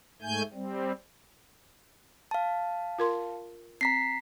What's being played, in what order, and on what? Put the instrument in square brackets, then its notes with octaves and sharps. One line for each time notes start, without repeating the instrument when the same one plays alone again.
[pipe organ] G#2 A3 G#5 G6
G3 C4
[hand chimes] F5 A5
[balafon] F4 A#4 C6
[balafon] C4 [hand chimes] A#5 B6 C7